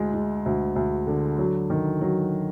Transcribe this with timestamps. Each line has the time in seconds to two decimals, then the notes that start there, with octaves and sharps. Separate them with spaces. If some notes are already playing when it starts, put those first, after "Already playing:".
Already playing: D2 G#3
0.14 G#3
0.46 D2
0.76 D2
1.07 D3
1.38 F#3
1.70 D#3
2.01 F#3